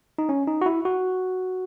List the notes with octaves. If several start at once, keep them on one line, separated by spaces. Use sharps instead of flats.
D#4
C#4
D#4
F#4
E4
F#4